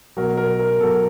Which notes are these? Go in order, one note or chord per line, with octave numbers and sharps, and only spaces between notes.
B2 F#3 A#4
A#4
A#4
B2 F#3 A4